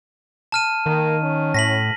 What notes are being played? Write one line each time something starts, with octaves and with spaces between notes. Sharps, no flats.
A5 F6 D#7
D#3 A#3
C#4
A2 A#6 B6 F#7